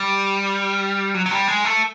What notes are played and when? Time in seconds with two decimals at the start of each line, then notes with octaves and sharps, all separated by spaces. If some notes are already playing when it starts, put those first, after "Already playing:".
Already playing: G3
1.14 F#3
1.26 F#3
1.31 G3
1.48 G#3
1.64 A3